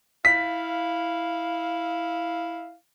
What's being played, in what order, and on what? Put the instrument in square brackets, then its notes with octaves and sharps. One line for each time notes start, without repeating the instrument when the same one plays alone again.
[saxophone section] E4 F5 [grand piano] B6